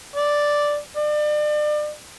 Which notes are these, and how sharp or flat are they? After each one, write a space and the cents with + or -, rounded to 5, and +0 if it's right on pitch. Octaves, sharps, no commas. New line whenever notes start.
D5 +0
D5 +35